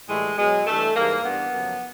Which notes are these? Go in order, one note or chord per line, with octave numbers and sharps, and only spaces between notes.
A2 E3 G3 G#3
B2 F#3 G#3
G2 E3 G3 A3
G#2 E3 G3 A#3
G2 E3 G3 B3
F#2 C#3 F3